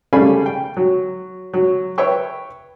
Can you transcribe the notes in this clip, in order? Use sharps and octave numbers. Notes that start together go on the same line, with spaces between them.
C#3 G3 A3 F5 G#5 B5
G5
F#3
F#3
B4 C#5 E5 G5 C#6